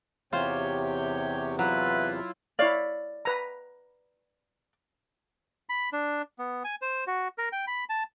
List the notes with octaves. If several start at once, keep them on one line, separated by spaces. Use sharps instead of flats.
E2 C3 F4 G4 C5 C#5 G6
F#3 E4 F4 B4
E4 C#5 D5 F5
B4 A#5
B5
D4
B3
G#5
C5
F#4
A#4
G5
B5
A5